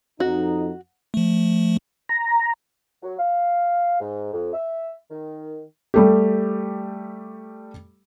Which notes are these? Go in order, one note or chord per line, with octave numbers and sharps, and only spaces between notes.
F2 D#4 F#4
F3 A3
A#5
F#3
F5
G#2
F2
E5
D#3
G3 A3 G4